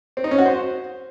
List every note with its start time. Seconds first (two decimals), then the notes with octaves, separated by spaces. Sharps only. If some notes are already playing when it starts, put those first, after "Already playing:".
0.17 C4
0.24 D#4
0.31 C#4
0.38 F#4
0.46 C5